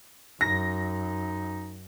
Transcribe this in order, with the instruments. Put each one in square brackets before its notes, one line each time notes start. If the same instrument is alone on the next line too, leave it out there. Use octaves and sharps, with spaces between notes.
[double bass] F#2 [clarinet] D#4 [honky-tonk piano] A#6